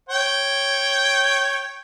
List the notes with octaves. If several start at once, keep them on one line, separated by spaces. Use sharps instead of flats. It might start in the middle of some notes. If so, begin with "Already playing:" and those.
C#5 G5